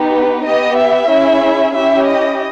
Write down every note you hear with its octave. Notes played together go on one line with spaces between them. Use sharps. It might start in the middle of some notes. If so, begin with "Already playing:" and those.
Already playing: B3 D#4 G4
B4
B3 G4 D#5
E5
C#4 E4 G#4
C#4 E4 G4 E5
D#5